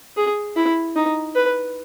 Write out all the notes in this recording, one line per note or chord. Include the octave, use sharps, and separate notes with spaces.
G#4
E4
D#4
B4